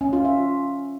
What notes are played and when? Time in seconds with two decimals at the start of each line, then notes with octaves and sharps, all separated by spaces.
0.01 C#4
0.13 F4
0.25 E5